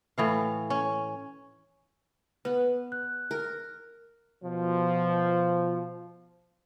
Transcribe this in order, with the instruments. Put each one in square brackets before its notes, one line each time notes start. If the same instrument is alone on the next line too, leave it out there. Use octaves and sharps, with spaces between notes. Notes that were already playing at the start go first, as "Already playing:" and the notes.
[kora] A2 E3 F5
C#4
[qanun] B3 [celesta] B4
[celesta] F#6
[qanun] A#4
[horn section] B2 F3